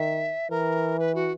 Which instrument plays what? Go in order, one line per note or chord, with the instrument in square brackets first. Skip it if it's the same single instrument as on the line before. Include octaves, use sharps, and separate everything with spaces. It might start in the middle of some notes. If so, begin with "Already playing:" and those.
Already playing: [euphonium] D#3 [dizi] E5
[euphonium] E3 [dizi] A#4
[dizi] B4
F#4